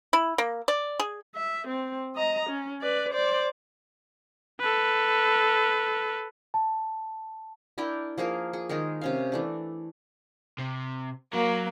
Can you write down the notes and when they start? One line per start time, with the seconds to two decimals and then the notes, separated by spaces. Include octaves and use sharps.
0.13 E4
0.38 A#3
0.68 D5
0.99 G#4
1.35 E5
1.67 C4
2.16 D#5 A#5
2.50 C#4
2.81 B4 D5
3.13 C5 D5
4.60 A4 B4
6.54 A5
7.78 D4 E4 A#4 G5
8.18 F3 A#3 G#4 A#4
8.53 G#4
8.69 D#3 G#3 G#4 A#4
9.01 C3 C#4 F5
9.32 E3 A3 D4
10.58 C3
11.34 F#3 A#3